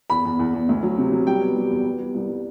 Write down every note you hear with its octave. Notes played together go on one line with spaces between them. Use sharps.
E2 B5
E2
E2
E2
D2
F#3
C3
F#3
G3 G5
B3
G3
E2
B3
G3
C2
G3